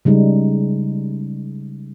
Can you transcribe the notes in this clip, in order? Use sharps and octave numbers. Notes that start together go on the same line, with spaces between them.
C#3 G3 G#3 D#4